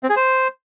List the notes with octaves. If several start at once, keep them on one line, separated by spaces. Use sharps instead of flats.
C4
G#4
C5